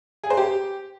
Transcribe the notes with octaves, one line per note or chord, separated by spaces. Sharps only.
G#4
C5
G4